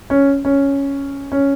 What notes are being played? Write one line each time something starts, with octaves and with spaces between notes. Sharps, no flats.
C#4
C#4
C#4